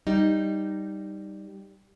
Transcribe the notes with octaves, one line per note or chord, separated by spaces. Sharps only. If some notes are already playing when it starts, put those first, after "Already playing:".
G3 D#4